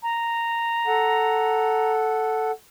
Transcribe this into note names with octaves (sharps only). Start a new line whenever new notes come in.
A#5
A4 F#5